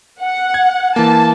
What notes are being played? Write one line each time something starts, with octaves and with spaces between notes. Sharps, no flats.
F#5
G#6
E3 A#3 A5